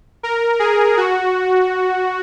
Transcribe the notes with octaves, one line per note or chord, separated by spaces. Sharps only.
A#4
G#4
F#4